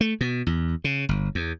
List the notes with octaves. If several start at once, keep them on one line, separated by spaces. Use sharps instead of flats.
A3
B2
E2
C#3
G1
E2